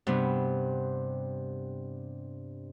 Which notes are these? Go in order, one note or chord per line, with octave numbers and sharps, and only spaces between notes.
G2 C3 B3